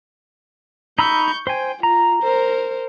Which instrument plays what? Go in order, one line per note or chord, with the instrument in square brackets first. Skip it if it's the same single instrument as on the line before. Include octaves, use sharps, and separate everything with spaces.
[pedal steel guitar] D#4 B5 E6 [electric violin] C#6 G6
[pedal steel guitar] C5 G#5 [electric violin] G5
[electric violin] F4 [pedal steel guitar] A#5
[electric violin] A#4 C5